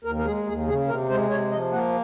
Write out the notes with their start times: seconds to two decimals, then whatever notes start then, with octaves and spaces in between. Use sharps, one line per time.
0.04 D#2 A#4
0.19 A#4
0.25 G#3 G#4
0.47 D#2 G#4
0.67 C#3 G#4
0.88 C3 A#4
1.10 G#3 C5
1.30 C3 C#5
1.51 F3 D#5
1.72 A#3 F#5